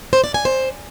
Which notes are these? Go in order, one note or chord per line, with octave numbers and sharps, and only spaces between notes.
C5
D5
G#5
C5